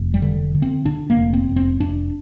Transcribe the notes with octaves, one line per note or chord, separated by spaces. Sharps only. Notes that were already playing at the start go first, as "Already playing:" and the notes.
Already playing: F1
G3
D3
D3
C4
D3 D4
A#3
F1
C4
F1
C4
F1 D4